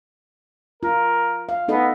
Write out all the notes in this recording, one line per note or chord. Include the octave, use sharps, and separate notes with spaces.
F4 A#4
F5
B3 D#4 A4 D#5